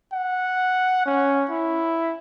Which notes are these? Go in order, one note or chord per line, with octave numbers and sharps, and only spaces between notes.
F#5
C#4
E4